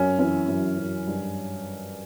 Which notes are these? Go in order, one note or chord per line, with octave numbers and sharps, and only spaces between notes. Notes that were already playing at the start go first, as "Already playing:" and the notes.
Already playing: F#2 C#4
E3 C#4
F#2
F#2
G2